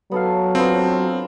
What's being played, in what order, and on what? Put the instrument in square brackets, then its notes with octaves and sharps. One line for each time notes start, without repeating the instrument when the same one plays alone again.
[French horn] F#3 [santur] B3 A4 F5
[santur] B3 D4 F4 [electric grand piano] C4